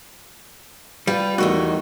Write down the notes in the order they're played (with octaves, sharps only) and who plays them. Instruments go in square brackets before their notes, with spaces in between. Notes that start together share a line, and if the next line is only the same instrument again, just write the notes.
[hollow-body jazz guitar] G3 [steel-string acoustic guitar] F4 B4
[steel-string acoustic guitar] E2 A3 D#5 [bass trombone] D#3 [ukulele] F#4